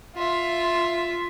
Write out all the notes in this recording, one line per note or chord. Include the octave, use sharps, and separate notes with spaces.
F4 E5